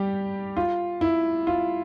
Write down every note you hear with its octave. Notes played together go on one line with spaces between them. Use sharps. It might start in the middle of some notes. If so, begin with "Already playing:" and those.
Already playing: G3 G4
F4
E4
F4